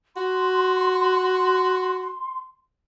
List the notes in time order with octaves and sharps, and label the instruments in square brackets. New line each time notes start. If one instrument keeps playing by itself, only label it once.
[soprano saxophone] F#4 [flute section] C6